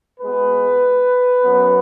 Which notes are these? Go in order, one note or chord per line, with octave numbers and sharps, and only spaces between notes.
B2 G#3 B3 B4
F#2 F#3 B3